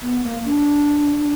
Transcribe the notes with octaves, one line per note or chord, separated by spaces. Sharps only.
B3
A#3
D4